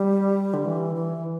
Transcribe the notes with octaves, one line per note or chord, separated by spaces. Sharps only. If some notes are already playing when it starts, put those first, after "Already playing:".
Already playing: G3
D3
E3
E3